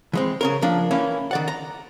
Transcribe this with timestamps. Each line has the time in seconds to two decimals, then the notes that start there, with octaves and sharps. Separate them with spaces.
0.13 E3 G#3 C4
0.41 C#3 C#4 A#4
0.62 F3 A#3 D4
0.91 E3 A#3 C#4 E4
1.31 D#3 D5 F#5
1.48 A#5